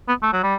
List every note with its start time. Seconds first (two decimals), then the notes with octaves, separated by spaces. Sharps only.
0.08 B3
0.23 A3
0.33 F#3
0.43 G3